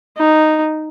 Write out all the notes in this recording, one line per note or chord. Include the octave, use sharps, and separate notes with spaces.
D#4